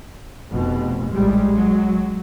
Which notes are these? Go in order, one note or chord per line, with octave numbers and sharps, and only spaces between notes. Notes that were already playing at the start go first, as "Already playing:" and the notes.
F1 F2 B2
A#1 A2 G3 G#3
F#3